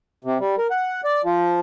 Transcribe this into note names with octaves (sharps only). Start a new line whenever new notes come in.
C3
G3
A#4
F#5
D5
F3